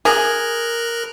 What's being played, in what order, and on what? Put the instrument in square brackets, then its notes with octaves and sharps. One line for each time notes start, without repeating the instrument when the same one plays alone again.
[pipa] G#4 [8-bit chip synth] A#4 A#5 F#6